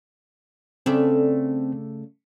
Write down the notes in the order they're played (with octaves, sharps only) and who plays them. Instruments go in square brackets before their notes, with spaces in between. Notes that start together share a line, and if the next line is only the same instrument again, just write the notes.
[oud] C#3 A3 D5 [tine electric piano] C4